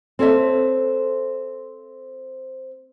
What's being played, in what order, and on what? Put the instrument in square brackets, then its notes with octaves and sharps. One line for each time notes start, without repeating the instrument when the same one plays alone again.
[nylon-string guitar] C4 A4 C#5 E5